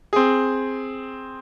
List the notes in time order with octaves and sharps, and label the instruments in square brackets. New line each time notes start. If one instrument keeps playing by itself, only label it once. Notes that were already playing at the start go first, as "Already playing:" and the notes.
[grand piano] C4 G#4